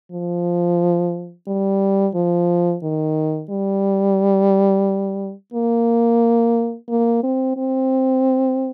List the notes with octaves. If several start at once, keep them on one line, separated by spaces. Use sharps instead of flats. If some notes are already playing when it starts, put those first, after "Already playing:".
F3
G3
F3
D#3
G3
A#3
A#3
C4
C4